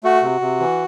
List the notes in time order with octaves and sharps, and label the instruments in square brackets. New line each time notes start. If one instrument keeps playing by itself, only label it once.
[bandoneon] A3 F#4
C3
C3
E3